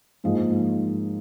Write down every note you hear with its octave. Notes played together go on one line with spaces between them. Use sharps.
G#2 F3 A#3 D#4 G#4